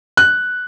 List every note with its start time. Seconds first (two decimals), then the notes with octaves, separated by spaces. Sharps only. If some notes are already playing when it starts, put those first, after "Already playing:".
0.17 F#6